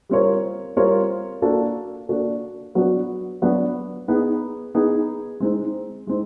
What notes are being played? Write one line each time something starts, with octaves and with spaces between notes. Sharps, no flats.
G3 C4 F4 A#4 C#5
G3 C4 F4 A#4 C#5
A#3 D4 F#4 A4
A#3 D4 F#4 A4
F#3 B3 D4 F#4
F#3 B3 D4 F#4
B3 D#4 G#4
B3 D#4 G#4
G#3 C4 D#4
G#3 C4 D#4